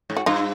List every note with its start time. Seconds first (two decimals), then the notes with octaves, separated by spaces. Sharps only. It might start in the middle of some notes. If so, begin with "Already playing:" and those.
0.10 G#2
0.17 F#4
0.26 G2 D#4 F4